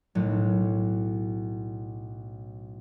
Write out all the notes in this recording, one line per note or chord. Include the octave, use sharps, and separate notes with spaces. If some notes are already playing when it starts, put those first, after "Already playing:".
B1 A2 F#3